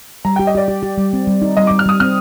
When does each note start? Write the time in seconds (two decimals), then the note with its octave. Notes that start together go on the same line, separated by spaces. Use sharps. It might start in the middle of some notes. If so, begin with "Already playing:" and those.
0.25 G3 A#5
0.36 G4 G5
0.47 D#5
0.55 G4 D5
0.68 G4
0.83 G4
0.97 G3
1.13 C4
1.27 G3
1.42 D#4
1.57 G3 D#5
1.67 G3 D6
1.79 F6
1.86 G3 D#6
2.00 C4 F6